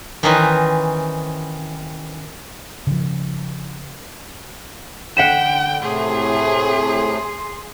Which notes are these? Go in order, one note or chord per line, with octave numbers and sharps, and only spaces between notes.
D#3 E3 C#4 D#4 B4 C5
C#3 F3
D3 F#5 G5 B6 E7
A2 C3 A3 G#4 C6